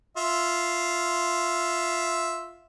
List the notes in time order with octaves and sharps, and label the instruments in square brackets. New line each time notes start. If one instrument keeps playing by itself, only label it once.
[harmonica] F4 E5